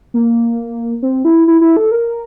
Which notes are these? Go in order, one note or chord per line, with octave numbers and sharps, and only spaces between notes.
A#3
C4
E4
E4
E4
A4
A#4